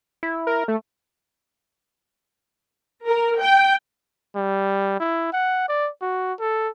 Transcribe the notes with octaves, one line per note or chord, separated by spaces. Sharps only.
E4
A#4
A3
A#4
G5
G3
E4
F#5
D5
F#4
A4